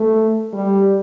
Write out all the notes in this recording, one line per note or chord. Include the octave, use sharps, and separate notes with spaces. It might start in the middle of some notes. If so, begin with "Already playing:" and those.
Already playing: A3
G3